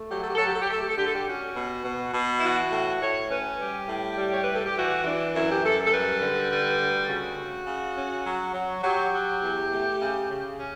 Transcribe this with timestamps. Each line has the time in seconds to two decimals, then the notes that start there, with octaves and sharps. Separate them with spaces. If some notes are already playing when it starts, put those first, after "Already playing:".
Already playing: A3
0.10 F#3 G4
0.19 A4
0.28 G4
0.35 A4
0.39 F#3
0.44 G4
0.52 A4
0.62 G4
0.69 A3 A4
0.79 G4
0.87 A4
0.96 D3 G4
1.04 A4
1.13 G4
1.26 C#4 F#4
1.56 B2
1.84 B2
2.14 B2
2.38 E4
2.43 E3 F#4
2.71 A2
3.01 A2 C#5
3.30 C#4 B4
3.59 G3 G4
3.89 A2
4.18 G3
4.30 C#5
4.42 A2 B4
4.53 A4
4.65 G4
4.76 E3 F#4
5.04 E3 D4
5.34 F#2 E4
5.49 G4
5.63 F#2 A4
5.85 A4
5.92 G3 B4
6.22 D3
6.50 G3
6.79 D2
7.08 C#3 F#4
7.38 C#3
7.66 C#3
7.96 C#4
8.25 F#3
8.54 F#3
8.83 F#3 G4
9.13 F#3
9.41 E2
9.70 A3
10.00 C#3
10.29 C#3
10.58 C#4